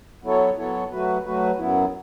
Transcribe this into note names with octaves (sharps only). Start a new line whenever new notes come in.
F#3 B3 E4 A4 C#5
F#3 B3 E4 A4 C#5
F#3 A3 F#4 B4
F#3 A3 F#4 B4
F#2 F#3 B3 E4